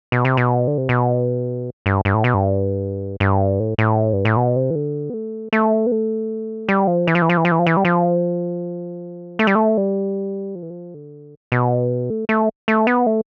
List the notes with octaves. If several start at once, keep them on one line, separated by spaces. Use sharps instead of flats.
B2
C3
B2
D3
C3
B2
G2
G2
A2
B2
G2
G2
A2
A2
G2
A2
B2
C3
E3
D3
B3
A3
A3
B3
A3
G3
F3
E3
F3
E3
F3
E3
F3
E3
F3
E3
G3
F3
A3
G3
A3
G3
F3
E3
F3
D3
B2
A3
A3
A3
B3
A3